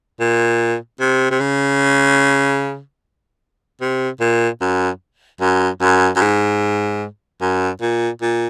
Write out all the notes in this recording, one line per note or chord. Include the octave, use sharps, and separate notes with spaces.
A#2
C3
C3
C#3
C3
A#2
F#2
F#2
F#2
F#2
G#2
F#2
A#2
A#2